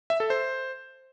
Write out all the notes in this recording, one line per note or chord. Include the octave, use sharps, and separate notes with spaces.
E5
A4
C5